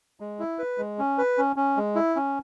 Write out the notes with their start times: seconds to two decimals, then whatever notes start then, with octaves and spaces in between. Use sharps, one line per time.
0.20 G#3
0.39 E4
0.59 B4
0.78 G#3
0.99 C#4
1.18 B4
1.38 C#4
1.56 C#4
1.77 G#3
1.95 E4
2.16 C#4